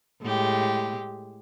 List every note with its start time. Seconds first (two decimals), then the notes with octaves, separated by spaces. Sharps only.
0.22 A2 G#3 G4